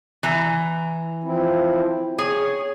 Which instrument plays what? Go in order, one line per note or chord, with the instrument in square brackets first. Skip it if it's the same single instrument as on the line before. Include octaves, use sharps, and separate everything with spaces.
[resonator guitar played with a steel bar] E3 A#5
[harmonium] F3 C4 E4
[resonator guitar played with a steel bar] G#4 [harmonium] C#5